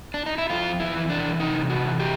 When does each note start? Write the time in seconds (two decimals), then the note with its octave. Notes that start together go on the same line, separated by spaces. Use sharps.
0.14 D4
0.26 D#4
0.38 E4
0.50 F2 F4
0.80 E4
0.94 E3
1.10 D4
1.40 C3 D#4
1.70 F#4
1.85 E3
2.00 G4